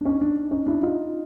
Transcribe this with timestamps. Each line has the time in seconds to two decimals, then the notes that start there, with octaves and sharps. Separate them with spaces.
0.01 D4
0.05 C#4 D#4
0.21 D4
0.51 C#4 D#4
0.66 D4 E4
0.82 D#4 F4